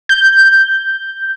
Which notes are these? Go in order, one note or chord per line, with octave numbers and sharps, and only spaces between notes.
G6